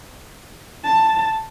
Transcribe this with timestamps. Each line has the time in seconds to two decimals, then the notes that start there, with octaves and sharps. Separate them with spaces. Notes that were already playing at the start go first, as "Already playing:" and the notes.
0.84 A5